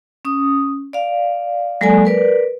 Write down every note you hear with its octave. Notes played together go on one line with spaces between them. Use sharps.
C#4 D#6
D5 F5
F#3 G#3 A#3 A4 D5 G#5
A#4 B4 D5